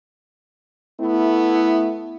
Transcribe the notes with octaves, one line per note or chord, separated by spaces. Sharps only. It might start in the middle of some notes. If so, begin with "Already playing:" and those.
A3 B3 E4